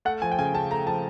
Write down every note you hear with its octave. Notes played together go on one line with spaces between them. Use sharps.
A3 F#5
F3 G#5
G5
C#3 G#5
C#3 A5
A3 A#5
F3 A5